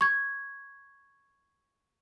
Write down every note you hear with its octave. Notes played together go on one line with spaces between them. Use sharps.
C#6 G#6